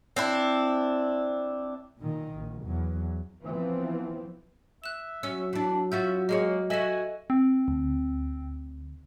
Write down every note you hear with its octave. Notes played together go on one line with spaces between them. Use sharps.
C4 D4 E4
A#2 D#3
A#1
E2 F#3
E3 F3 B3 C4
E5 F#6 E7
F#3 C#4 E6
E3 D4
C#4 F4 F#4 E5 G6
G#3 A#3 G#4 C#5 D#5
F#4 A4 D#5 E5 G#5 E7
C4
D2